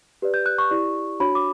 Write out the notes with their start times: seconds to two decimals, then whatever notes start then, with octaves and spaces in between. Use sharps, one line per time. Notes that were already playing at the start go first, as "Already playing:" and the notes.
0.22 G4 B4 D5
0.34 G6
0.46 F#6
0.58 C#6
0.70 E4 G4 D5
1.20 D4 F#4 C#5 B5
1.35 D6